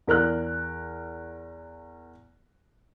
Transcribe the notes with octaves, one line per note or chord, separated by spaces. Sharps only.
E2 A#4 F6 F#6